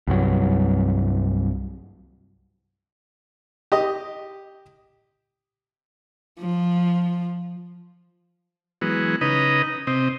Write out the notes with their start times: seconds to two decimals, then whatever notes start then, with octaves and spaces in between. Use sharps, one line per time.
0.07 C2 G2 F#3
3.72 G4 D#5
6.39 F3
8.81 E3 F#3 G#3 B3
9.21 C#3 D#4 B4 D#5 A#5
9.87 C3 C4 D#5